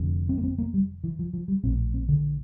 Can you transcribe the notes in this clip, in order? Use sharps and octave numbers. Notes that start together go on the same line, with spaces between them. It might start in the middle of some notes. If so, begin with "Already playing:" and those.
Already playing: F1 F2 D3
C4
A#3
C4
A#3
G3
E3
F3
F3
G3
A#1 A2 C4
C4
D3